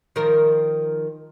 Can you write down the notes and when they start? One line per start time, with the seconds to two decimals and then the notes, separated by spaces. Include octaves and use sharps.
0.16 D#3 F3 A#4